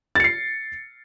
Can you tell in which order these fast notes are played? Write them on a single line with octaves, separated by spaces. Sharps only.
A6 C#7 C7